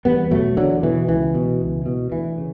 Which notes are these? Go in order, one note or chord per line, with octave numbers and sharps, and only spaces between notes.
E2 G3 B3
B2 F#3 A3
E2 D3 F#3
B2 E3
C#2 E3
B2
C#2
B2
D2 E3
C#3